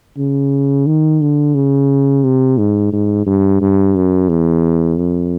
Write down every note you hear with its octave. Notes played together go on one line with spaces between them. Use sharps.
C#3
D#3
D3
C#3
C3
G#2
G#2
G2
G2
F#2
E2
F2